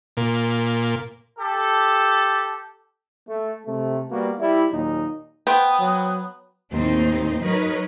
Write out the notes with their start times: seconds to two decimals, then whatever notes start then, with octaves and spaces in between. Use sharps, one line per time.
0.17 A#2
1.38 G4 A4
3.28 A3
3.66 C3 A3
4.11 G3 A#3 B3 F#4
4.39 G3 E4
4.71 D#2 A#2 F#3 D#4
5.47 B3 C5 G5
5.79 F#3
6.72 D#2 A2 C4 D#4 C5
7.43 F#3 D#4 A#4 B4 C#5 D#5